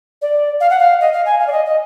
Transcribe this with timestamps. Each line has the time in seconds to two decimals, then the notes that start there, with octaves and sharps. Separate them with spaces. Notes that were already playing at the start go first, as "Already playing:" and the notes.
0.21 D5
0.60 F5
0.70 F#5
0.79 F5
1.00 D#5
1.12 F5
1.26 G#5
1.39 F5
1.47 D5
1.52 D#5
1.66 D#5